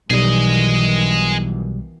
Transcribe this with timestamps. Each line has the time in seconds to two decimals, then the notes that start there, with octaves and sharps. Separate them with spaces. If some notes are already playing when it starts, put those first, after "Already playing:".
0.10 B1 B2 D#3 E3 G3 G#4 D#5